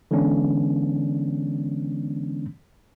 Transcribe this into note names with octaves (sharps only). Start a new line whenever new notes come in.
D3 E3 G#3 B3 C#4 D4